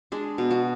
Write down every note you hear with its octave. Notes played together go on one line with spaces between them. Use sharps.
G#3 D4
B2
F#4